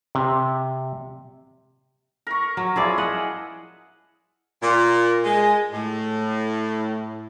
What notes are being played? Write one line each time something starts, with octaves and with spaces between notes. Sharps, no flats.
C3
A#4 C#6
F#3
F3 E4 G#4 D5 E5
D#5 F#5
A#2
G#3
A2